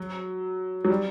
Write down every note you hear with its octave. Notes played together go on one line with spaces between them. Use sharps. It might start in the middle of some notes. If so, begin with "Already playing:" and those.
Already playing: F#3
F#3
G3